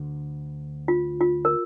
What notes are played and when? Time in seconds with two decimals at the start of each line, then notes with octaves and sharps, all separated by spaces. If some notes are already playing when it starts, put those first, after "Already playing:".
Already playing: D2 D3
0.88 F4
1.21 F4
1.45 A#4